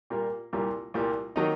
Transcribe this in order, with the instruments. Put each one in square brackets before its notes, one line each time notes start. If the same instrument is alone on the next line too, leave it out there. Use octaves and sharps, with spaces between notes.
[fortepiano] A#2 G3 A#3
C2 A#2 G3 A#3
C2 A#2 G3 A#3
D#3 F#3 A#3 D#4